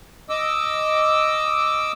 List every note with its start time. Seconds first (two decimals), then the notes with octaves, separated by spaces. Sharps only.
0.29 D#5 D6 E6